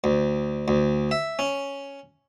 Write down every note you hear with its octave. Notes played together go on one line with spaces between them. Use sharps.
D2
D2
E5
C#4